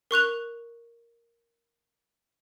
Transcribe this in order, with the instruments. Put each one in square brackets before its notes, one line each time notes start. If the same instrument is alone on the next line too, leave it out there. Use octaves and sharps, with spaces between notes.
[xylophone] A#4 C#6 F#6 F7